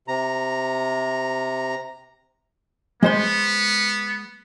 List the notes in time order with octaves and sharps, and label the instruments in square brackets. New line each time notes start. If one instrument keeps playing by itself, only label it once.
[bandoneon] C3 A#5
[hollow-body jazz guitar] G#3 C5 C6 [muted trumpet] B3